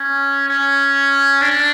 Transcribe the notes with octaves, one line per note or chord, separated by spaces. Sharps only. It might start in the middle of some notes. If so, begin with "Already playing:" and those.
Already playing: C#4
C#4
D4